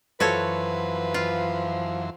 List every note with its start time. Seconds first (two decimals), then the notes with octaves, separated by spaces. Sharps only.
0.20 F#2 E3 F3 F#4 A4 B4 C#5 C6
1.14 F4